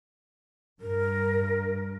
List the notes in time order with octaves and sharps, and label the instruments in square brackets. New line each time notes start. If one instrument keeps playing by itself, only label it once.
[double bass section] G2 [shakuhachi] A#4